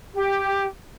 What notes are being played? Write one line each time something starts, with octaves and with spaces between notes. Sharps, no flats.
G4